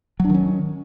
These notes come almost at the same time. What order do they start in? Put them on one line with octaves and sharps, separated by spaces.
F#3 D4 D#3 C#4